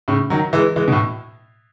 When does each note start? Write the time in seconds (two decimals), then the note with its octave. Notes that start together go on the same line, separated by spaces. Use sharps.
0.08 A2 C#3
0.30 D#3 F#3
0.53 E3 G#3
0.76 E3 G#3
0.88 B2
0.92 A2